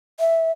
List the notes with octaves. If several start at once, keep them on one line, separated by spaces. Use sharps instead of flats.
E5